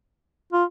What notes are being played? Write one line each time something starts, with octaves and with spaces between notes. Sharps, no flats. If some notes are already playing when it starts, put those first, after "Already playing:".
F4